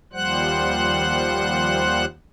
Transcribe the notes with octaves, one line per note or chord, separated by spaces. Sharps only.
D#2 F3 G3 C5 F#5 F#6